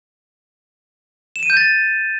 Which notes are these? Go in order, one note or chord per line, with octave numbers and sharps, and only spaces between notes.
E7
D#7
G6
A6